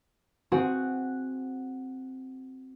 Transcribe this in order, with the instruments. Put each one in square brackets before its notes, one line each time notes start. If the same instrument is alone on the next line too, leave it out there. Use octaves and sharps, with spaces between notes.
[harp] C4 F#4 G#4 F#5